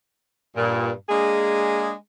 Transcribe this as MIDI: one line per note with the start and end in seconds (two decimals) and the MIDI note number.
0.57 0.92 43
0.57 0.92 46
1.09 1.93 56
1.09 1.93 58
1.09 1.93 62
1.09 1.93 68